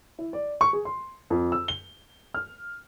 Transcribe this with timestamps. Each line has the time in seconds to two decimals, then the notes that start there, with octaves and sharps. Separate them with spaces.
0.19 E4
0.33 D5
0.61 C#6
0.73 G#4
0.85 C6
1.30 F2
1.52 E6
1.68 G7
2.34 F6